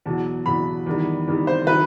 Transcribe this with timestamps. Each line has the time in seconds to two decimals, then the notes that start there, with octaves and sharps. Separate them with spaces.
0.06 E2 B2 F#3 A5
0.46 E2 B2 F#3 B5
0.86 E2 D#3 G3
1.27 E2 D#3 G3
1.47 C5
1.67 D#3 F#3 B4